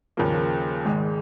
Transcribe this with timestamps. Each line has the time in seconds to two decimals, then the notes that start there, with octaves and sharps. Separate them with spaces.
0.17 D#2 C#3 F3 A#3
0.85 G#1 G#2 D#3 G#3